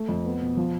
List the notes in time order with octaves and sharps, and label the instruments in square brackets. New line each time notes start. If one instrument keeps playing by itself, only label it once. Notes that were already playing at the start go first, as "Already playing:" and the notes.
Already playing: [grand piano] A3
F2
B3
B2
F3